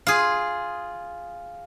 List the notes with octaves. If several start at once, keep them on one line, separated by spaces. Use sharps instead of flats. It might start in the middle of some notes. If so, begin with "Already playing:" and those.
F4 G#4